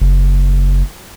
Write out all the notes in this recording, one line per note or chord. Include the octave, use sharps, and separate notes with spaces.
F#1